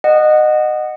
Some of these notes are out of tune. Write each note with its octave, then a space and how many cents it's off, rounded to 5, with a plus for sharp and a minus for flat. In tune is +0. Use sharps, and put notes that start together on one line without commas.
D#5 -20 F#5 +0